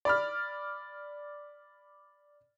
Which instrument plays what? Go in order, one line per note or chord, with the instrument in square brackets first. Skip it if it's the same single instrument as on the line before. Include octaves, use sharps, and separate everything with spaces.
[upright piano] D5 B5 F6